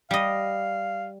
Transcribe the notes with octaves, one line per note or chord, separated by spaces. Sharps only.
G3 D#5 F5